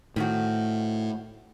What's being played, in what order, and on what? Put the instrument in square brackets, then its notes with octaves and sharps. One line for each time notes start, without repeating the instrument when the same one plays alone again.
[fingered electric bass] A2 [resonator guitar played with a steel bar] D#3 C4 F#4